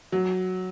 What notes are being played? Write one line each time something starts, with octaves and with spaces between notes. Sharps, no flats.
F#3